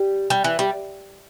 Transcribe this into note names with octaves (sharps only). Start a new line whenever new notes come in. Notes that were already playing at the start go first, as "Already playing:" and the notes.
Already playing: G3
G3
E3
G3